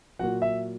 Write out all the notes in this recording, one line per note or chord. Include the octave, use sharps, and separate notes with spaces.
A#2 F#3 F#4 F#5
E5